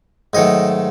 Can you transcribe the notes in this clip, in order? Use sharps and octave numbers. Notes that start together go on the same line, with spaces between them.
G#2 D#3 F#3 A3 D#5